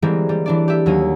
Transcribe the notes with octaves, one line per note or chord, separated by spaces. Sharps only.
E3 G3 G#3 A#3 C4
G3
E3 D4 D5
G4 E5
D#2 F#3 A#3 D#7